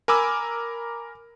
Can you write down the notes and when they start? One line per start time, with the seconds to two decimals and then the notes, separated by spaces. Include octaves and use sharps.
0.08 A#4 G#5 B5 D6 E6